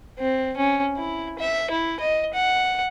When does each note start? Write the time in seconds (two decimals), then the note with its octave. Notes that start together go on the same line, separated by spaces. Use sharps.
0.19 C4
0.57 C#4
0.97 E4
1.39 E5
1.71 E4
2.00 D#5
2.34 F#5